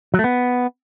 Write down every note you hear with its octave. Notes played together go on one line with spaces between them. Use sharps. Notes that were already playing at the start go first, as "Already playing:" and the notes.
F#3
A3
B3